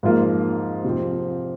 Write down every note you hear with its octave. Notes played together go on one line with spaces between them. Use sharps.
G#2 F3 A#3 F4
C3 F3 C4